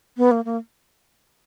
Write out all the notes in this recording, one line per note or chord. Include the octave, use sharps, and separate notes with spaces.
B3
A#3
A#3